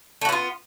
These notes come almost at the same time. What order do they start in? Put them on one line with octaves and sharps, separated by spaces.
A3 F#4 B3 F4